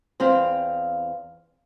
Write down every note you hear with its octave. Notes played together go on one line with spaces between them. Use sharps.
E2 C4 F5